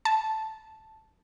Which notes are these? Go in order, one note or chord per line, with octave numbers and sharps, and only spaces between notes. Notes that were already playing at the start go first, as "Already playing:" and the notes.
A5